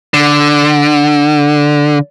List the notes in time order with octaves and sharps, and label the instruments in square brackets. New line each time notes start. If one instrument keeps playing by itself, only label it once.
[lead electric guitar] D3